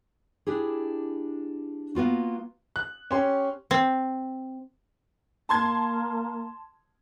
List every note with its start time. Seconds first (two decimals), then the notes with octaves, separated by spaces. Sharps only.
0.47 D4 E4 G4 G#4
1.95 A#3 B3 F4 F#4
2.76 F#6
3.11 C#4 G4 C#5 C6
3.71 C4
5.49 A#3 A5 C6 G#6